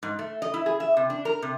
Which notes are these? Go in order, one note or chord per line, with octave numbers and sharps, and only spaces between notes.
G#2
A3
D#5
E4
G#4
E5
C3
D4
A#4
C3